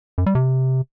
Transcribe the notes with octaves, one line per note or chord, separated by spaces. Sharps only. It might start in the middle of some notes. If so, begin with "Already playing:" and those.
F#2
G3
C3